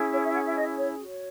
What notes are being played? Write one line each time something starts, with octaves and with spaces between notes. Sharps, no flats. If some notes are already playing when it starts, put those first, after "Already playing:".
Already playing: C#4 E4 G#4
C#5
E5
F#5
E5
D#5
C#5
F#4 C#5